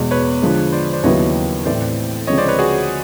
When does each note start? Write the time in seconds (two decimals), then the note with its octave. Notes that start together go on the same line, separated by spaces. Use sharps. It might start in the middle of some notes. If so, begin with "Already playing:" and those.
Already playing: E2 B2 G#3
0.11 B4 C#5
0.42 D3 F3 G#3
0.72 C5 D5
0.93 C5 D5
1.03 D#2 C#3 F#3 B3 E4 C#5 D#5
1.65 A2 E3 A3 C4 C5 D5
2.27 D2 C#3 F3 G#3 C4 C#5 D#5
2.38 C5 D5
2.48 B4 C#5
2.59 F#4 G#4